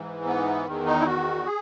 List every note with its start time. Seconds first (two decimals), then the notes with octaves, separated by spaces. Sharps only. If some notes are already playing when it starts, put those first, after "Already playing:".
Already playing: G#2 E3
0.26 B3
0.65 E2 D#3
0.86 D#4
1.00 E4
1.06 F#4
1.45 G#4